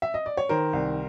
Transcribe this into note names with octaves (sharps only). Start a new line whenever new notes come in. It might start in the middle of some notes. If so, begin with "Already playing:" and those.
E5
D#5
D5
C#5
D#3 A#4 C5
C2